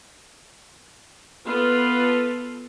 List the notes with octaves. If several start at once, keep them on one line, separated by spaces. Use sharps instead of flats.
B3 F4 A4 B4